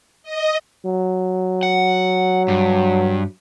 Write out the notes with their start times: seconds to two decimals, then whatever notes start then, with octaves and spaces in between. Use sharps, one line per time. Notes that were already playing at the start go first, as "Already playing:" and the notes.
0.23 D#5
0.86 F#3
1.63 F#5
2.48 G2